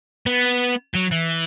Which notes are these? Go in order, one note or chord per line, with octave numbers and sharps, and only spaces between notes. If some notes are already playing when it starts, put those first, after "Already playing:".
B3
F#3
E3